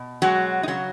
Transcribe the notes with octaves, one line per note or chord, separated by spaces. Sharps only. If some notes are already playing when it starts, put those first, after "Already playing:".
Already playing: B2
F#3 G#3 F#4
D#4
C#3 F#3 F#4